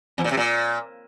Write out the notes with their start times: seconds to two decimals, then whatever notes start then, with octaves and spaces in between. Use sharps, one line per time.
0.18 E2
0.24 A#2
0.31 C3
0.37 A#2